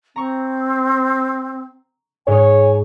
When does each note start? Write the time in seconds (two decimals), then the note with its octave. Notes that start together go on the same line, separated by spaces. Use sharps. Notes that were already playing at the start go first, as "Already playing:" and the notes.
0.16 C4 A#5 C#6
2.28 G#2 D#4 C#5 G#5